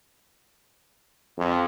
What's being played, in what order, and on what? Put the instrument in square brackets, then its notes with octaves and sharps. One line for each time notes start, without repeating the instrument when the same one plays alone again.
[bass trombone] F2